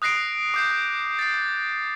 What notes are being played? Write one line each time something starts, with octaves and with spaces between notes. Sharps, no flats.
D#6 F#6 A#6 C7 D7
D6 G6 C7
A6 C7